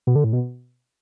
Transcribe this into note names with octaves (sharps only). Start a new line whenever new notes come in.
B2
D3
A2
B2